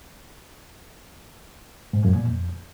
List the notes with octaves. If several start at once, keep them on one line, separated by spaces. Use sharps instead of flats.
G#2
F#2
A#2
F2